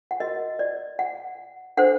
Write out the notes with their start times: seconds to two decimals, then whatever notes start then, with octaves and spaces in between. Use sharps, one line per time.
0.11 F#5
0.20 F#4 A#4 D#5
0.59 D5
0.99 F#5
1.77 D4 A4 C5 F#5